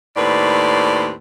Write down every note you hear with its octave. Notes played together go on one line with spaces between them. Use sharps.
D#2 A2 C4 B4 D5